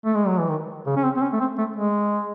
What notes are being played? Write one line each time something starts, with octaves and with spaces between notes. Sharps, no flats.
A3
G#3
F#3
E3
D#3
C#3
C#4
C4
C4
C#4
A3
C4
A3
G#3